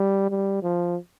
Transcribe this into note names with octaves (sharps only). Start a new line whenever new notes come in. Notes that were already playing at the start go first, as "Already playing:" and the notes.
Already playing: G3
G3
F3